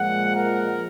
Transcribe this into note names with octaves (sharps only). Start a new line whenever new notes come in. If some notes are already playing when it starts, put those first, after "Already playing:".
Already playing: A#2 F3 G#3 F#5
A#4